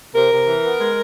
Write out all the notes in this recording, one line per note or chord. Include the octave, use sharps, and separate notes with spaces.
C3 A#4
C3
E3
B3
G#3